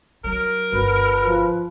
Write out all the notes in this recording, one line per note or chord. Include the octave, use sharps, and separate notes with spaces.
F#3 A#4
G1 F#4 B4
F3